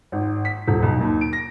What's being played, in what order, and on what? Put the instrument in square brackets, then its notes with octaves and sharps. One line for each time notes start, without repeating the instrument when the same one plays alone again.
[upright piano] G#1
B6
D#1
B1
D#2
D7
A#6